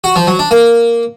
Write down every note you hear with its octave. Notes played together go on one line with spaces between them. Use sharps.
F#4
F3
F#3
D4
A#3